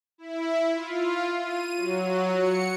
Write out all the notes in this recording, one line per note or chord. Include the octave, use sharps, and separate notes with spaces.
E4
F4
D#7
F#3
C#7